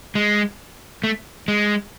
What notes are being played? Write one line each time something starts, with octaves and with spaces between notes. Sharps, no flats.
G#3
A3
G#3